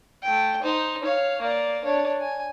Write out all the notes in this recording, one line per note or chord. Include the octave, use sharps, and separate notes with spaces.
A3 G5
D#4 C5
C#5 F5
A#3 D5
D4 C#5
G#5